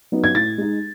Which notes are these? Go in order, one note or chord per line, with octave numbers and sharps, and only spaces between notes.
F#3 B3 D#4
G#6
A2 A6
G#3 D#4